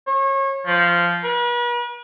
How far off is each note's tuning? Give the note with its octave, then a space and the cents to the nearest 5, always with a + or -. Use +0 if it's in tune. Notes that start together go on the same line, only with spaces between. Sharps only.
C#5 -30
F3 -10
B4 -45